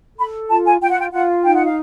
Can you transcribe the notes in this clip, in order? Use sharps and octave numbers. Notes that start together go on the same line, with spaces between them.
A4 B5
F4 A5
G#5
F4 G5
F#5
G5
F4 F#5
D#4 G5
F#5
F5